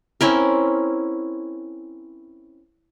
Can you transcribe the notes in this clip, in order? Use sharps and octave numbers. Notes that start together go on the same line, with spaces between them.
C4 C#4 E4 A#4